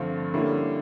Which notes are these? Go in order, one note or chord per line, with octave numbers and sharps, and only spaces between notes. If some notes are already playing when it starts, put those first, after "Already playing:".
Already playing: G2 D3 F3 A3 C4
D3 G3 A#3 C#4 E4